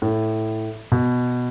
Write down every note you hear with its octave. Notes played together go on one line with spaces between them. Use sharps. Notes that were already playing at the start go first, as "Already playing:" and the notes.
A2
B2